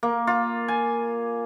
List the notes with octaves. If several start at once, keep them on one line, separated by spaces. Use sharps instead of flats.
A#3
F4
G#5